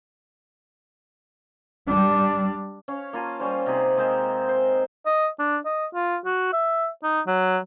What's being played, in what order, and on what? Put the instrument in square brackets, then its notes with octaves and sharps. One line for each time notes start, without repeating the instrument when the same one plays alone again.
[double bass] G3 D4
[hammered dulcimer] C#4 C#5 F5
A#3 F4 G#5 A5
G3 C#4 F4 C5
C3 D#4 G#4 C5
G#3 C4 A#4 C5
C5
[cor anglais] D#5
D4
D#5
F4
F#4
E5
D#4
F#3